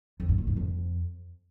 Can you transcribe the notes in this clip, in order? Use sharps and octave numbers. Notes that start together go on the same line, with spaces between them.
F2
G2
B2
G#2
F2